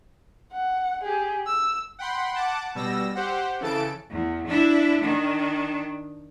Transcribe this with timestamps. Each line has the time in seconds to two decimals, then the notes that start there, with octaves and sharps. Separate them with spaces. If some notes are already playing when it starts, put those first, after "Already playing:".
0.53 F#5
1.04 G4 G#4
1.46 E6
1.99 F#5 G5 B5 C6
2.34 F#5 A5 D6
2.75 B2 G3 E6 A#6
3.15 G4 C5 F#5
3.61 C#3 E3 A4 A5 D7
4.11 E2
4.47 D4 E4
5.01 D#3 D4